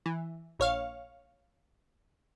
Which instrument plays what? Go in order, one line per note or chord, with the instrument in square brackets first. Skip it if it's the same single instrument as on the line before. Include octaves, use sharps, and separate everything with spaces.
[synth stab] E3
A#1 C#5 F5